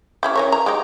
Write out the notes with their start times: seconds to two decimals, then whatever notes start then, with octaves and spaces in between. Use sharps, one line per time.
0.23 C#4 E4 G4
0.36 E3 A#4 C#5
0.52 A#5
0.66 G#3 D#4 G4